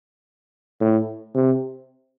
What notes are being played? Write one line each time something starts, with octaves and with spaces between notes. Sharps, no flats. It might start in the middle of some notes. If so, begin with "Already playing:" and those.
A2
C3